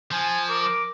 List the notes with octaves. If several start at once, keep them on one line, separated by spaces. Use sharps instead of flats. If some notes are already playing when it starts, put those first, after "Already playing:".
F3 G#5
A#4 D6